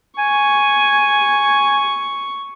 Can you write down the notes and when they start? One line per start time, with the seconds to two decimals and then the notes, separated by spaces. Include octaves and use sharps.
0.18 G#5 C#6